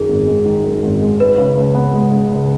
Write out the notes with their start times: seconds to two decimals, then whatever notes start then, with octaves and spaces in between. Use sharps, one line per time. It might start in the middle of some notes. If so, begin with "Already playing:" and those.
Already playing: F#2 D#3 G#4
0.08 G#1
0.27 G#3
0.45 D#3
0.64 F#2
0.83 G#1
1.02 G#3
1.20 G#3 B4
1.38 C#3
1.57 C#2
1.75 B3
1.94 G#3
2.12 C#3
2.31 C#2